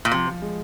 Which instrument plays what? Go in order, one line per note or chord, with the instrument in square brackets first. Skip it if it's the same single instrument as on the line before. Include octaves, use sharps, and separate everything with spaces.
[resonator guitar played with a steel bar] A#2
[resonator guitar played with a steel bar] C3 [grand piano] F3
[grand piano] F3
G#3